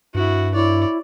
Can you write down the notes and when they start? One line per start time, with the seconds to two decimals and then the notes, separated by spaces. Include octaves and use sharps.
0.15 G2 E4 F#4
0.54 E4 C#5 D5